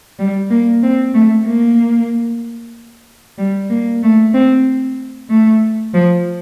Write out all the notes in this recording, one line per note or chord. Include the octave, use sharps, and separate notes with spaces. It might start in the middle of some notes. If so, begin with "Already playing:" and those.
G3
A#3
C4
A3
A#3
G3
A#3
A3
C4
A3
F3